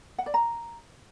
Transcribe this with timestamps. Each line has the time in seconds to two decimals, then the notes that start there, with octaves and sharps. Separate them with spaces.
0.18 F#5
0.26 D5
0.34 A#5